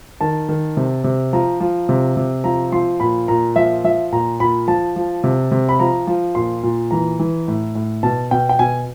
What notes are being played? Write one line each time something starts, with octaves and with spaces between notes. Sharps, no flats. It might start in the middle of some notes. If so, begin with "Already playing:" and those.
D#3 A5
D#3
C3
C3
F3 A#5
F3
C3
C3
F3 A#5
F3 C6
A#2 B5
A#2 A#5
F3 E5
F3 E5
A#2 A#5
A#2 B5
F3 A5
F3
C3
C3
B5
F3 A#5
F3
A#2 C6
A#2
E3 A#5
E3
A2
A2
B2 A5
B2 G5
G5
B2 G#5